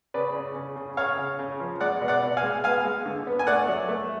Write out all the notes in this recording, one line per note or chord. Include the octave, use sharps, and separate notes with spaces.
C#3 B4 D5
C#3
C#3
C#3
C#3 C#5 F5
C#3
C#3
F3
G#3 D5 F#5
B2
D5 F#5
B2
F5 G#5
G#3
B3 F5 G#5
G#3
D3
B3
G#5
A3 D5 F#5
F#3
A3